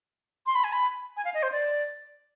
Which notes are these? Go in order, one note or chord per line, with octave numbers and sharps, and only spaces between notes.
C6
B5
G#5
B5
G#5
F5
D#5
C5
D5